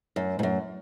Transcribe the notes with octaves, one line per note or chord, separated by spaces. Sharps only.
F#2
G#2
F#2